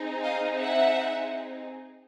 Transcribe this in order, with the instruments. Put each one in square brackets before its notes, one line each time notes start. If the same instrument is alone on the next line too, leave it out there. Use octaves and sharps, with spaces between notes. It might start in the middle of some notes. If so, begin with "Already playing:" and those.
Already playing: [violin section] C4 D#4 G#4
D#5 F5
E5 F#5